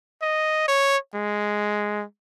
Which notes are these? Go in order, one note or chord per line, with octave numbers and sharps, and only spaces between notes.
D#5
C#5
G#3